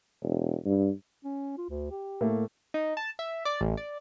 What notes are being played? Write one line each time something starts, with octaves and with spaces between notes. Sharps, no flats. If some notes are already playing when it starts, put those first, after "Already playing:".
E1
G2
C#4
F4
D2
G4
A2 A3 A#3
D#4
A5
E5
D5
A1
D5